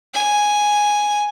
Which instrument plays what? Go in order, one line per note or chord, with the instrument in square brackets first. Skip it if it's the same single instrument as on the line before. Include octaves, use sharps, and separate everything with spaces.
[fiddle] G#5